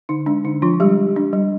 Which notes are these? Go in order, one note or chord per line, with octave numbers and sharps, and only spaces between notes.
D3 D#4
G#3 D4
D3 D#4
F3 D4 F4
G3 G#3 G4
G3
D4
G3